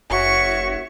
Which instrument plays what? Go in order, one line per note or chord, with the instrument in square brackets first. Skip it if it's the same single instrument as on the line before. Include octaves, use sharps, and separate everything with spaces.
[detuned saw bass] F#1 [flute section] F#4 C#5 E5 [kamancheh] C#6